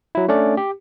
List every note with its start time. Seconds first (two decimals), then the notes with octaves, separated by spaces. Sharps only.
0.15 F#3 E4
0.28 A3 C#4 D4 D5
0.57 G4